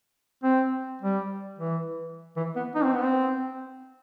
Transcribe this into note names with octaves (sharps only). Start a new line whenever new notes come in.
C4
G3
E3
E3
B3
D#4
C4
B3
C4